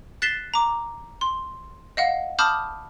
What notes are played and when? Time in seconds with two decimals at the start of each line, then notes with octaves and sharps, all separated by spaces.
0.22 F#6 A6 B6 C7 E7 G7
0.54 A#5 D6
1.21 C6
1.97 D#5 F5 F#5
2.39 A5 B5 D6 D#6 F6 G6